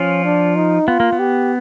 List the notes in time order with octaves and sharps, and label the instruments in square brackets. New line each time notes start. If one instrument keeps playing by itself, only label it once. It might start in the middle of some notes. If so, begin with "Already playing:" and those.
Already playing: [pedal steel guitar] F3 F4 [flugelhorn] C#4
[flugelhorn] D4
D#4
[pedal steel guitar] B3 [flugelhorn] F4
[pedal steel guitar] A#3
B3
[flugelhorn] G4